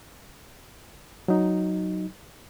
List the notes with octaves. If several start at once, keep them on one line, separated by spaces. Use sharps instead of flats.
F#3 D#4